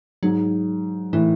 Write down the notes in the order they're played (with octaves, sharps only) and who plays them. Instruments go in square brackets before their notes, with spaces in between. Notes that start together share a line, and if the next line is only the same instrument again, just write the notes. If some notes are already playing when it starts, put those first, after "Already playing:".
[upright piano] G#2 [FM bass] F#3
[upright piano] A2 [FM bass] E3